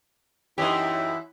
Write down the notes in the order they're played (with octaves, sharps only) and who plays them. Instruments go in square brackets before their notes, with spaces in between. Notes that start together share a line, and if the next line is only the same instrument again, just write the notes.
[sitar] F#2 E3 [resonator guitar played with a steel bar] D#4 G4 [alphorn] E4 [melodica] E5